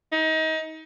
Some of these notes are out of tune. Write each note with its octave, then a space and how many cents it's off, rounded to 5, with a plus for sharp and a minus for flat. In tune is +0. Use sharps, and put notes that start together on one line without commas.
D#4 +30